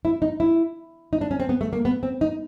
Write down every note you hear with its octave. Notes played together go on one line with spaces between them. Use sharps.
E4
D#4
E4
D#4
D4
C#4
C4
B3
A3
A#3
B3
C4
D#4